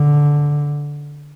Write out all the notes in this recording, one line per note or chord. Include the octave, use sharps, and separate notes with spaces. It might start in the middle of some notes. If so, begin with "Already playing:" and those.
Already playing: D3